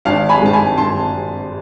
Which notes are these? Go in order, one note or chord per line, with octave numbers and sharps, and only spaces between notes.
G#1 F5 A5
G#5 B5
G#2 G#3 C4 A5
G#5 B5
G#1 A5 C6